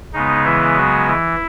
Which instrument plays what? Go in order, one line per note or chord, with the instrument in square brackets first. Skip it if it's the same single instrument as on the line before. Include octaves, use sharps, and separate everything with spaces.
[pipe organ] C#3 G#3 B3 D#4
E3 E4
F#3 F#4
E3 E4